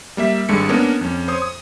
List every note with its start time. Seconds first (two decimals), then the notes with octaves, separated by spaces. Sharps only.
0.17 G3 A#3 E5 B6
0.49 G#1 G2 G#3 A4 C#7
0.69 A#3 B3 C#4 D4 A#4
1.01 F2 C#4
1.28 C5 C#5 D#6
1.42 D#6